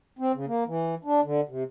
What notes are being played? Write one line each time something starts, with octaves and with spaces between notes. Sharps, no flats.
C4
C#3
A#3
E3
D4
D3
C3